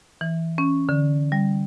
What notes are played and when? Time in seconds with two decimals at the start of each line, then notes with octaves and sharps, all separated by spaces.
0.21 E3
0.58 C#4
0.89 D3
1.32 G3